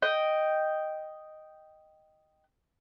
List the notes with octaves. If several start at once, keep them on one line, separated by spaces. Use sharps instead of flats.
D#5 G5